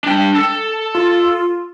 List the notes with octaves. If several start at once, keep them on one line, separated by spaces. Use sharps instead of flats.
D4 G5
A4
F4